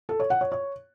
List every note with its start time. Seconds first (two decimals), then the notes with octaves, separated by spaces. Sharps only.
0.09 A4
0.20 C#5
0.30 F#5
0.41 C#5
0.52 C#5